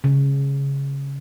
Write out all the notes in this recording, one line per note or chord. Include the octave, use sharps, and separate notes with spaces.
C#3